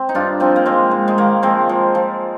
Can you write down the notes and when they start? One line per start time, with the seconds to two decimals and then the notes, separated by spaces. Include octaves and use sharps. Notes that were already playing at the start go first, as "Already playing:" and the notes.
Already playing: C4
0.09 D#4
0.15 G2 D4 F4
0.40 F3 C4 D#4
0.56 A#3
0.66 G#2 G#3 C4
0.91 G#2
1.08 G#3
1.18 D#3 A#3
1.43 F3 G#3 C4
1.69 F3
1.95 F3